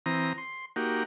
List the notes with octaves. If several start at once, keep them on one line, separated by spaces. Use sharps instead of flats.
E3 C4 A#5 D#6
C6
A#3 D#4 F#4 G4